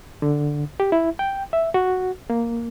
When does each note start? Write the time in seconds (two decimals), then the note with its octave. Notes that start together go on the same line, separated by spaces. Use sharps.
0.22 D3
0.80 G4
0.92 E4
1.19 G5
1.53 E5
1.74 F#4
2.30 A#3